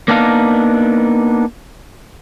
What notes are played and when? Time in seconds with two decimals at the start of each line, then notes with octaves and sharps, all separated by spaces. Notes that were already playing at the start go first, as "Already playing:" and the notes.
0.08 A#3 B3 D4 D#4 F5